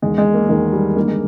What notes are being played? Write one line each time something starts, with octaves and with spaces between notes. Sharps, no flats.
E1 E2 D#3 G#3
G#3
A#3
E1 E2 D#3 A#3
G3
G1 G2 D#3 A#3
G#3